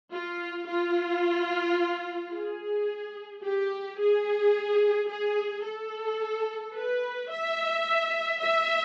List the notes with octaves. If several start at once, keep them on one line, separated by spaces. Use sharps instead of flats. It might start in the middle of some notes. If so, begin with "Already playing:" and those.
F4
F4
G#4
G4
G#4
G#4
A4
B4
E5
E5